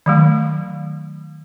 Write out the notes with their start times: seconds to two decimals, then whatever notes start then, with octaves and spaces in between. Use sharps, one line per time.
0.06 D#3 F#3 A3